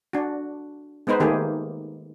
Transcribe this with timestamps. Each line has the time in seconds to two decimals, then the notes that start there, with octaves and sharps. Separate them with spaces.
0.13 D4 F#4
1.07 G#3 B3 D#4 B4 C5
1.20 D#3 A3 A#3 G4 G#4